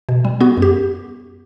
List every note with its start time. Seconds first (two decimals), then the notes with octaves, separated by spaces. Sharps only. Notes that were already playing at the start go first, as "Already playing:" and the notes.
0.09 B2
0.25 G3
0.41 B3 F#4
0.57 F#2
0.62 G4